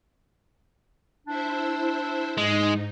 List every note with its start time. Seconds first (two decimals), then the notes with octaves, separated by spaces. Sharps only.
1.27 D4 E4 C5 E5
2.37 G#2 G#3 D#4